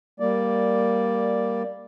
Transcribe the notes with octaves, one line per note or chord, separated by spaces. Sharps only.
G3 A#3 D5